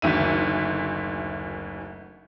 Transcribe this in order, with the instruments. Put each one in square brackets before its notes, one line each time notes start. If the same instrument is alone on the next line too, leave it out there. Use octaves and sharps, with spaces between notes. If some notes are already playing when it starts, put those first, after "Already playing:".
[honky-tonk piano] F#1 D2 D#3 E5 D#7